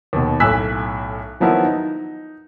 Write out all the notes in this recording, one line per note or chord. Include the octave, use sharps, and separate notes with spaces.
D#2 B2
B1 A2 G#5 E6 F#6 B6
D#3 F3 F#3 B3 E4 F4
D#4